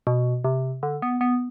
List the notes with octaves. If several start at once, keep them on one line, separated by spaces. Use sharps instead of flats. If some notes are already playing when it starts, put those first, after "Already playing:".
B2
C3
D3
B3
B3